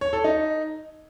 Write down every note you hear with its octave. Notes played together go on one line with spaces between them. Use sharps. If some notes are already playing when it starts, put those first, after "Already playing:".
C#5
A4
D#4